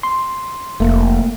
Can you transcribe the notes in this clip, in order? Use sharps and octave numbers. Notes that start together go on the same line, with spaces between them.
C6
F1 A3 A#3